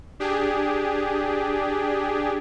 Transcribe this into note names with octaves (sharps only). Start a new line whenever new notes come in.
D4 G4 G#4